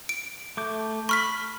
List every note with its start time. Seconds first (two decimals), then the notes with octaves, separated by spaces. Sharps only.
0.09 D7
0.57 A3 D6 G6
1.09 B5 C#6 F6 B6